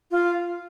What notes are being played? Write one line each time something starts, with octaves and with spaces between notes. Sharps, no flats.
F4